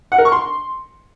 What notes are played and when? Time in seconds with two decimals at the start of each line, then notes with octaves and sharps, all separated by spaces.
0.12 F#5
0.18 A#4
0.25 C#6
0.32 C6